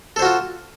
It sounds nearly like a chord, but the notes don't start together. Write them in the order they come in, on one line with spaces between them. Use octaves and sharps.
A4 C5 F#4 F4